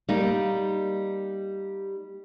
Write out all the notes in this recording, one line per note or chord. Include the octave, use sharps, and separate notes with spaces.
G3 A#3 D#4